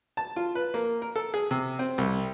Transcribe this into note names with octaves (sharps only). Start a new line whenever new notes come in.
A5
F4
B4
A#3
A#4
A4
G#4
C3
C4
C2